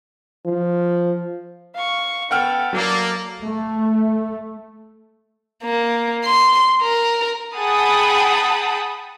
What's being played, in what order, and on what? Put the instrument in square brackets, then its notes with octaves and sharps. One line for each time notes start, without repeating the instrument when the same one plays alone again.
[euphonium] F3
[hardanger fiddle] F5 C#6
[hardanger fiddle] B3 A4 [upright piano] F#5 G5 F6
[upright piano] F#3 [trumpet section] A#3 [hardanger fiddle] A4 D5
[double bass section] A3
[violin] A#3
C6
A#4
[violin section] G#4 F#5 G5 A5 B5 D#6